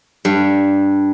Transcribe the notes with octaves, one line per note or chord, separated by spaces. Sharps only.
G2